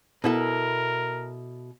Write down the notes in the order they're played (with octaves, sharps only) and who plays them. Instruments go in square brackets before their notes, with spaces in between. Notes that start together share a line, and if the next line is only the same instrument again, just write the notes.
[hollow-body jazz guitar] B2 E4 A4 [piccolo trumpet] A#4